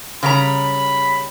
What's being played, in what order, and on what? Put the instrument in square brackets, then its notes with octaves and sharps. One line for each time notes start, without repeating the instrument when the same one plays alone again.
[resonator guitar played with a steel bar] C#3 G3 A#5 [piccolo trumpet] B5